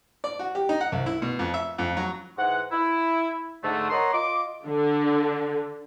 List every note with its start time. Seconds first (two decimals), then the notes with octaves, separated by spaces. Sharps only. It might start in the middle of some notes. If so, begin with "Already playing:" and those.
0.24 D5
0.39 F#4
0.55 G4
0.69 D#4
0.81 F#5
0.92 C2
1.06 E4
1.22 B2
1.39 F2
1.54 E5
1.78 F2
1.97 F#3
2.38 G#2 E3 G#3 F#5
2.71 E4
3.63 G#2 D3 A3
3.90 A#4 C#5 D#5 F#5 A#5 C6
4.13 F4 D#5 C6 D6
4.66 D3